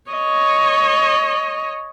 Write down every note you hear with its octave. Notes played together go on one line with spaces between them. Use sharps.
C#5 D#5